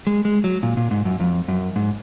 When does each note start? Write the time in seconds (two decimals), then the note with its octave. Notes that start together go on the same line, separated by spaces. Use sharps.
0.07 G#3
0.25 G#3
0.44 F#3
0.63 A#2
0.77 A#2
0.91 G#2
1.05 F#2
1.20 F2
1.48 F#2
1.76 G#2